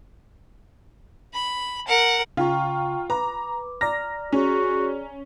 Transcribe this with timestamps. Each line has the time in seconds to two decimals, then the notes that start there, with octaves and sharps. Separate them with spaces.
1.34 B5
1.88 A#4 F#5
2.37 C#3 F4 G5 A#5 C#6
3.10 B4 A#5 D6
3.81 D5 A#5 F6 A#6
4.32 C#4 F#4 G#4